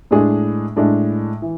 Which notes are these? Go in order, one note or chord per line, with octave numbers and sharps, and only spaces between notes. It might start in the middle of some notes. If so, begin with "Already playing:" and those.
A2 G#3 D4 G#4
A2 G#3 D4
E3